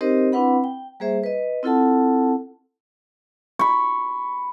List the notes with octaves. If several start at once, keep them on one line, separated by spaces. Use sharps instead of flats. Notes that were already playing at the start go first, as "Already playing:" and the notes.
C4 D#4 G4 A#4 C5 D#5
C4 D4 E4 B4 F#5 B5
G5
G3 A#3 G#4 C5 E5
B4 D#5
C4 E4 F4 A4 F#5 A5
B5 C#6